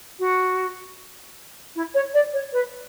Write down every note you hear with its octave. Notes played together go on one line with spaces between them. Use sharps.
F#4
E4
C#5
D5
C#5
B4